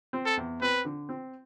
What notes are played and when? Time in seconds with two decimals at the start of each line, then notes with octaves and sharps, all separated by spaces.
0.13 C4
0.26 A4
0.37 E2
0.61 C4 B4
0.85 D3
1.09 C4